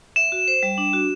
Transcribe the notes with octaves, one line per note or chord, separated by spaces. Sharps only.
E5 E7
F#4
C5
G3
D4
F#4